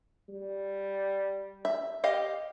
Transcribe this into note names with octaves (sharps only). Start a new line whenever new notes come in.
G3
E5
G4 D#5 F5